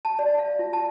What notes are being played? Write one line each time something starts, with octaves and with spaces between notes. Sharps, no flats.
A5
D5
F5
F4
A5